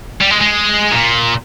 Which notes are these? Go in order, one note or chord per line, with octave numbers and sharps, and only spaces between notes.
G3
G#3
G#3
A#2